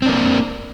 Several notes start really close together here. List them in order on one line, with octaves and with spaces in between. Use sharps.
C4 D4 A#3